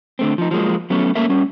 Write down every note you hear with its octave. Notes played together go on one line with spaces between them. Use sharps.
D3 A3 C4
F3 D#4
F3 F#3 G#3 A#3
F#3 A3 B3 C#4
A3 A#3 C#4 A#4 E5
G3 C#4